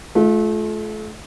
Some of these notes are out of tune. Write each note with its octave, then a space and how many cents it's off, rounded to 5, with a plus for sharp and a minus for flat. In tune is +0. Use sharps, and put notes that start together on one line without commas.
A3 -35 F4 +5